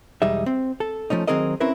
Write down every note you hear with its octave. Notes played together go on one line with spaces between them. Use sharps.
B1 E2 G3 G#3 D#4 E5
C4
A4
F3 A3 C#4 D#4
D#3 F#3 C4 G#4 A#4 D#5
C4 C#4 E4 A#4 B4